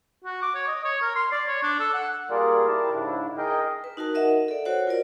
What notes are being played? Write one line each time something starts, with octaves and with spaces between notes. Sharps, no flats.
F#4
D6
C#5
D#5
C#5
A#4
C6
D5
C#5
D4
A4
F#5
G3 A#3 F4 G#4 A#4 D5
E4 G4 A#4 D5 A5
G#2 C#3 D4 E4
G#4 A#4 D#5 G5
B4
D#4 F#4 A#4 A5
A#4 D#5 E5 F#5
A4 D5
F#4 C5 C#5 F#5
F4 A#4 C5 D5